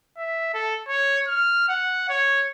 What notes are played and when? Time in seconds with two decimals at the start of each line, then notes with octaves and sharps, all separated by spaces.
0.17 E5
0.54 A4
0.88 C#5
1.27 F6
1.68 F#5
2.09 C#5